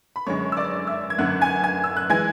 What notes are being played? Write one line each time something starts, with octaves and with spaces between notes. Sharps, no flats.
B5
F#2 D3 G#3 C#5 C#6
E6
D5 D6
E5 E6
G#6
G#1 F#2 D3 F#5 F#6
G#5 G#6
G#5 G#6
E6
F#6
E3 G#3 G#5 G#6